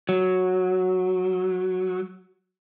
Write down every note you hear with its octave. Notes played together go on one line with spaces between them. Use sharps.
F#3